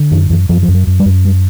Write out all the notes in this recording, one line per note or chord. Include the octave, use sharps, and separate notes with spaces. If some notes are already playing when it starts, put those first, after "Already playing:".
Already playing: D3
F#2 D#3
F#2 E3
F#2 F3
F3
F#2
F#3
F#2
G3
F#2
G3